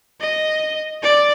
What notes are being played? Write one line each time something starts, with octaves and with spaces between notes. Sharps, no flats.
D#5
D5